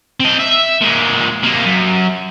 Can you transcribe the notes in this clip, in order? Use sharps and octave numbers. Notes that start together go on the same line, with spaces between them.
C4 D#5
E5
A#2 G#3
C3 A#3
F#2